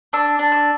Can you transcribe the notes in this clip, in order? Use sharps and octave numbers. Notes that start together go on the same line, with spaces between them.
D4 E6
D4
E6